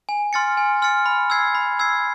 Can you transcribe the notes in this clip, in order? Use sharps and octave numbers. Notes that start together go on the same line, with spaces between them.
G#5
C6 F6 A6 C#7
G#5
C6 F6 A6 C#7
B5
E6 G#6 C7
B5
E6 G#6 C7